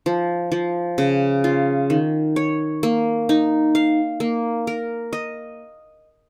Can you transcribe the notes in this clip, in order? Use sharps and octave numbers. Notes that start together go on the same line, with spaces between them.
F3
F3
C#3
F4
D#3
C#5
A#3
D#4
F5
A#3
A#4
D#5